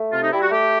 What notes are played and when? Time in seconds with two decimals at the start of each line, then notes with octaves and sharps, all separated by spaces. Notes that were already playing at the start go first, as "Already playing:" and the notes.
Already playing: A3
0.13 C3 F4
0.22 D#4
0.32 G3 E4
0.41 F#4
0.51 A3 G4